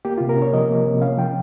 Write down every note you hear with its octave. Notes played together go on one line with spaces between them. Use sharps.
A#3 G4
C3 F4
A#4
C#4
C#5
F3 D#5
A#3
C3
C#4 F5
F3 G5